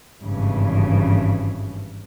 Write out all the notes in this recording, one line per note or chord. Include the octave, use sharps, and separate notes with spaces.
G#1 G2 C#3 E3